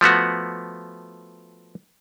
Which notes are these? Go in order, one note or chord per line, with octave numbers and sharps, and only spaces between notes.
F3 A3 B3 F#4